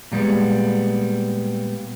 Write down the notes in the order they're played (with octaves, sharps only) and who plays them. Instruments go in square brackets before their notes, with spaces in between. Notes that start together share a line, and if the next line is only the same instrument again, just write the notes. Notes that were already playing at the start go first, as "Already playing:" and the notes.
[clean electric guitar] A#2 G3 G#3 B3